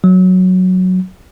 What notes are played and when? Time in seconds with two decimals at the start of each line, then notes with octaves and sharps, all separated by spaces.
0.04 F#3